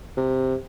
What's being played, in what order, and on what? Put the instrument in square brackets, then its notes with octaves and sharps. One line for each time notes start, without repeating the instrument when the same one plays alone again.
[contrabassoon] C3